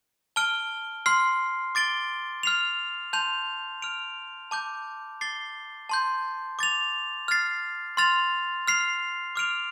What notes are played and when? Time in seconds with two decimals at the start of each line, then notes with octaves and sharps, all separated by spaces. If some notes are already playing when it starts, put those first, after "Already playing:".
0.36 A5 F6 D7 G7
1.06 C6 F6 C7
1.75 D6 A6 D7 G7
2.43 F6 C7 F7
3.13 A5 C6 G6 F7
3.82 F6 D7 F7
4.51 A5 D6 G6
5.21 D6 A6 C7 G7
5.89 A5 C6 G6
6.59 D6 A6 F7
7.28 F6 A6 C7
7.97 C6 F6 A6 F7
8.67 F6 C7 F7
9.36 D6 F6 D7 F7